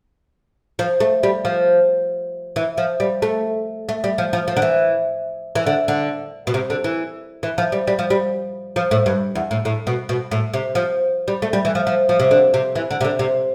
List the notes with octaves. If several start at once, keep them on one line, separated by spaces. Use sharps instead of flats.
F3
A3
G3
F3
E3
F3
G3
A3
A3
G3
F3
F3
F3
D3
E3
E3
D3
D3
B2
C3
D3
E3
E3
F3
G3
G3
F3
G3
F3
A2
G2
E2
A2
A2
B2
B2
A2
C3
F3
G3
A3
G3
E3
F3
F3
F3
C3
D3
C3
E3
D3
C3
D3
C3